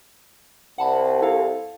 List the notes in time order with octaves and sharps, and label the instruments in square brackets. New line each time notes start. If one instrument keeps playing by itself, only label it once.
[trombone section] C2 [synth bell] F#5 A5 B5
[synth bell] E4 A4 F5